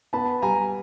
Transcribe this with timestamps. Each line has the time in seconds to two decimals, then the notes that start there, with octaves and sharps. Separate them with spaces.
0.13 B3 A5 B5
0.42 G3 G#5 A#5